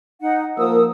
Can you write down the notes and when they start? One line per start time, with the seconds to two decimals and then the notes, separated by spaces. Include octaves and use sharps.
0.21 D#4 F#5
0.57 F3 A#3 A#4 D#6 E6